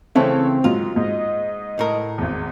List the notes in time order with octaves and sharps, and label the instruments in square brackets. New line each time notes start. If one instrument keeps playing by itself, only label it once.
[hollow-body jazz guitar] C#3 E3 A3 [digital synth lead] C4 [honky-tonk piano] C#5 A5
[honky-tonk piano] G#2 F#3 [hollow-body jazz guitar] F4
[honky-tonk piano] G#2 [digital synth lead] D#5
[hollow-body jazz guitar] A2 A#4
[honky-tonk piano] G#1 E2